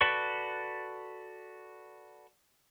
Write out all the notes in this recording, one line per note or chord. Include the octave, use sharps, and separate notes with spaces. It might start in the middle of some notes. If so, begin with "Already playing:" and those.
F#4 A4 B4 D5 C#6